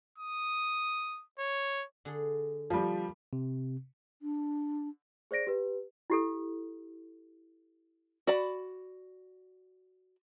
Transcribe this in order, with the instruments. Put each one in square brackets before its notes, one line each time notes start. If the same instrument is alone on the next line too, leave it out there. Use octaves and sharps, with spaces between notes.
[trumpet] D#6
C#5
[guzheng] D3 G#4 A4
[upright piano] F3 G3 [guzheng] A#3 F4
[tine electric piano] C3
[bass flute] D4
[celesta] G#4 C5 D5 A#6 D7
G4 B4
[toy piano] E4 G4 A4
[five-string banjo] F#4 D5 B5